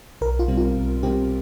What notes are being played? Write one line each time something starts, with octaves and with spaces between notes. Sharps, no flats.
B1 A#4
F4
B2 G3 C4
F4
B1
B2 G3 C4 G4